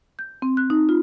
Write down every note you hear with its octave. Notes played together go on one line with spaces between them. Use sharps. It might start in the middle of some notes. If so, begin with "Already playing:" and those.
G6
C4
F#6
D#4
F4